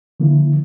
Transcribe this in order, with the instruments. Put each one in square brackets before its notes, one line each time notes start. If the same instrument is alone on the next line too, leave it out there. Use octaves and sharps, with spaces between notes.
[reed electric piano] D3 F3 A#3 E4